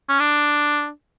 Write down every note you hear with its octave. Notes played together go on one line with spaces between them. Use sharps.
C#4
D4